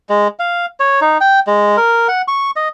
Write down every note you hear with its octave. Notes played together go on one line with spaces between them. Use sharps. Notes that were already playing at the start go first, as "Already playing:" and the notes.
G#3
F5
C#5
D#4
G5
G#3
A#4
F#5
C#6
D#5